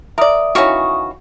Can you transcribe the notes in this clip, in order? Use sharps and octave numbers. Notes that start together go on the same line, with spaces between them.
A#4 D5 E5 D#6
D#3 E3 C#4 F#4 F5 C#6